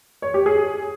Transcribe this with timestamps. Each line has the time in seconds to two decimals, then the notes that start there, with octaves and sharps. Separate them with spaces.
0.22 C#5
0.34 G4
0.46 G#4